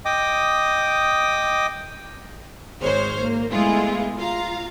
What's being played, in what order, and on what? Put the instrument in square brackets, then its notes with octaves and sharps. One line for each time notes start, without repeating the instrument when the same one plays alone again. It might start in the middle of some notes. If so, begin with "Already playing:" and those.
[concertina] D#5 G5 D6 D#6
[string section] G#1 G#3 C5 C#5 F6
A#3
G#3 A3 B3 E4 F4 G#4
F4 F5 A#5